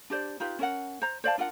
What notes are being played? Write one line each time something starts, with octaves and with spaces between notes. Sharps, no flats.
D4 G4 C5 D5
D#4 F4 G4 B4
C#4 A#4 F#5
C5 A#5
C5 D5 F5 A5
D4 F4 A#4 F#5